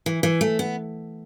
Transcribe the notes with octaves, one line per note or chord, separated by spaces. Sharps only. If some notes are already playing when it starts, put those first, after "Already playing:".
E3
E3
A3
B3